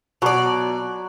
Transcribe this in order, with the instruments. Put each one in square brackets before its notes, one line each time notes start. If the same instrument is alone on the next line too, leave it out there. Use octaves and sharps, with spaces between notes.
[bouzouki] B2 D5 [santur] F#3